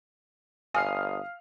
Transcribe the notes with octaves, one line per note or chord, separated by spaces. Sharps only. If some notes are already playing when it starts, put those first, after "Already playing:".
G1 F5 G#5 D#6 F6 C7